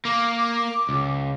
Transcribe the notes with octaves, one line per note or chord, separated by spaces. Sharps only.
A#3 D6
C#2